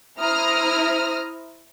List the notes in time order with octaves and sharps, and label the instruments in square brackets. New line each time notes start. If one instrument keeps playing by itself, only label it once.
[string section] E4 C5 A#5 D#6 F6